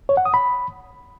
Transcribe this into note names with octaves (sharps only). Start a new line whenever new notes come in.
C#5
F#5
D#6
B5